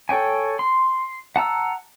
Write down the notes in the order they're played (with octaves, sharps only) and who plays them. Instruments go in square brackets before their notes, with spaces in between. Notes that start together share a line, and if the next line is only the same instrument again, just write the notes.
[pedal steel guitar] A4 C#5 G5 G#5
C6
F#5 A5 A#5 E6